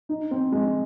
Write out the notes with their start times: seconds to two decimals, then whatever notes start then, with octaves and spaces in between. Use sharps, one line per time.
0.09 D#4
0.31 C4
0.52 G#3